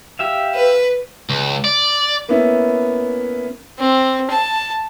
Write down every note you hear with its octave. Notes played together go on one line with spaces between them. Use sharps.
G4 E5 F5
B4
C#2
D5
A#3 B3 C#4 E4
C4
A5